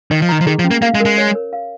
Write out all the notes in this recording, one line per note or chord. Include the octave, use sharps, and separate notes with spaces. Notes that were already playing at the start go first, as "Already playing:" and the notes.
D#3 D#5
F3
D#3 A#5
F3
D#3 G#4
F3
C#4
A#3
A#3 F5
G#3
A#4
G#3
C#5
A#4
F5